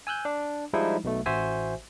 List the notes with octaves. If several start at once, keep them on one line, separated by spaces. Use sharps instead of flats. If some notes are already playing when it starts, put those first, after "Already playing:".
G#5 E6 F#6 G6
D4
F3 G3 G#3 D#4 E4
B1 B2 A3
A1 F#4 C5 E5 G#5